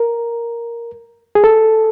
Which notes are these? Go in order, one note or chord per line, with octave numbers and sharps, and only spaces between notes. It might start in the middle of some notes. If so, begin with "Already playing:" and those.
Already playing: A#4
G#4
A4